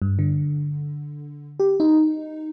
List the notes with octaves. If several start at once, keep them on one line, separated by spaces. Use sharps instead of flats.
G2
D3
G4
D#4